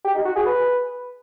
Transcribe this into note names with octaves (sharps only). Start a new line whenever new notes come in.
G4
D#4
F#4
G#4
B4